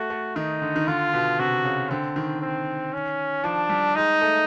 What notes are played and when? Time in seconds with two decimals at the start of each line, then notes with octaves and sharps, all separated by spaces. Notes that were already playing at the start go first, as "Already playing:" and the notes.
Already playing: A3 F#4
0.10 A3
0.36 D#3 D#4
0.62 D3
0.76 D#3
0.87 D3 F4
1.13 B2
1.39 C3 F#4
1.65 C#3
1.90 D3 C4
2.16 D#3
2.41 C4
2.93 C#4
3.44 F3 D4
3.69 G3
3.95 G#3 D#4
4.21 A3